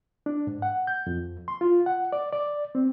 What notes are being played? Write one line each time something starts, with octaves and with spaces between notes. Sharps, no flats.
D4
G#2
F#5
G6
F2
C6
F4
F#5
D5
D5
C4